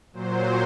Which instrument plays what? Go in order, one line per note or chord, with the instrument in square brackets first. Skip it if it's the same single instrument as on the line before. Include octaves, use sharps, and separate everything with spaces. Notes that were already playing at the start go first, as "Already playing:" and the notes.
[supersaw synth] A#2 F#3 C5